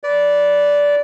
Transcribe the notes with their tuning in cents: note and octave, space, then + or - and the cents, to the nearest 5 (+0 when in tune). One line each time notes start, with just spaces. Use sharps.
B4 +0 D5 -15